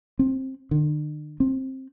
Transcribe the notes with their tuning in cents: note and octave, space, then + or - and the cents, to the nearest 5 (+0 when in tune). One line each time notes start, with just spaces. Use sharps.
C4 +15
D3 +45
C4 +15